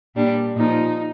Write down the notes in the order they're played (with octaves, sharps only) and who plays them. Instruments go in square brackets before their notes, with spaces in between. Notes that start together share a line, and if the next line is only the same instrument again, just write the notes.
[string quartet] A#2 G3 D4
A#2 F3 D#4